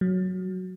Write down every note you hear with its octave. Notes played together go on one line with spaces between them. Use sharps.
F#3